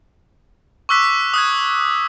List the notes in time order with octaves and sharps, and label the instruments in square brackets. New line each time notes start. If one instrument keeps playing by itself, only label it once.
[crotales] C#6 D6 E6 F#6 B6
D#6 F#6 G#6